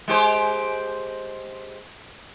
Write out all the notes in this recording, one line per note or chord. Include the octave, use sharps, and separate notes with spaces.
G#3 G4 C5